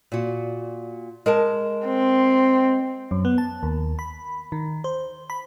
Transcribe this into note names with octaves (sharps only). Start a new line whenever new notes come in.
A#2 F#4
G#3 A#4 A5
C4
F#2
B3
A5
D#2
B5
D#3
C5
B5